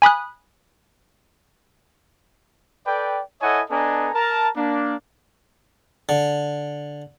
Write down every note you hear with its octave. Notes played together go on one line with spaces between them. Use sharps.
G#5 B5 D#6 F#6
A4 B4 D5 G5
E4 A4 C#5 D#5 F#5 G#5
B3 D4 A4 D#5 G#5 A#5
A#4 A5 A#5
A#3 D4
D3